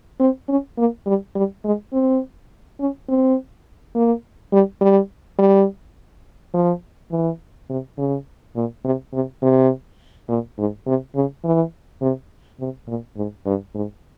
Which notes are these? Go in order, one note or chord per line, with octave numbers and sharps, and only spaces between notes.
C4
C#4
A#3
G3
G3
G#3
C4
C#4
C4
A#3
G3
G3
G3
F3
E3
C3
C#3
A#2
C3
C3
C3
A#2
G#2
C3
C#3
E3
C3
C3
A#2
G#2
G2
G#2